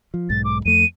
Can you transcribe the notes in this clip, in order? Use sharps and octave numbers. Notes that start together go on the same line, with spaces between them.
F3
B1 G#2 A6
D6
F2 A3 D#7